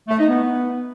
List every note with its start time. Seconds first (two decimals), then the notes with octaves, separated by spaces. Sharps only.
0.08 A3
0.18 D#4
0.28 B3